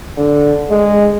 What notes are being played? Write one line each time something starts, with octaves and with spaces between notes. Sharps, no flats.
D3
G#3